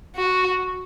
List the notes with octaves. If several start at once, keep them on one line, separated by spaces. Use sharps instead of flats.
F#4